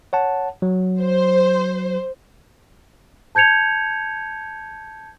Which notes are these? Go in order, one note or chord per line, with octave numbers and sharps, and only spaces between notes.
C#5 F#5 A5
F#3
C5
A5 G6 G#6 C#7 F7